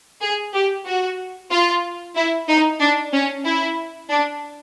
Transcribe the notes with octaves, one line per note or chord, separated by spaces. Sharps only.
G#4
G4
F#4
F4
E4
D#4
D4
C#4
E4
D4